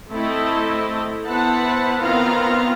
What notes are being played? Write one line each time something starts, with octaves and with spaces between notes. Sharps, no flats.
A3 C4 E4 A4 D#5
B3 E4 B4 C5 F#5 A5
D#3 B3 C4 F4 F5 A#5